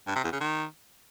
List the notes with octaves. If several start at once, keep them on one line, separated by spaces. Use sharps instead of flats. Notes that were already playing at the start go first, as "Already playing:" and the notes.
G2
C3
E2
C#3
D#3